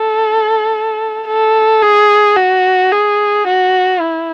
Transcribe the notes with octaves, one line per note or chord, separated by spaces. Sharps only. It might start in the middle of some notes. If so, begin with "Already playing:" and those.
Already playing: A4
A4
G#4
F#4
G#4
F#4
E4